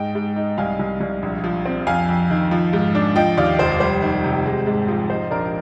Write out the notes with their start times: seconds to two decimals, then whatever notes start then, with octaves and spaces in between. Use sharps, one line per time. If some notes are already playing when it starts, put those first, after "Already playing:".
Already playing: G#2 D#5 G5
0.15 G#2
0.36 D#4
0.58 C2 F5 G#5
0.79 C2
1.00 C2
1.22 A#1
1.44 F3
1.65 C4
1.87 F2 F5 G#5
2.09 F2
2.30 D#3
2.51 F3
2.73 G#2
2.95 D4
3.16 F3 D#5 G5
3.37 D#2 D5 F5
3.59 F1 C5
3.80 G3 C5
4.02 D#3
4.24 C3
4.46 G#3
4.66 G#2
4.88 F3
5.10 D#4 C5
5.31 A#1 A#4 D5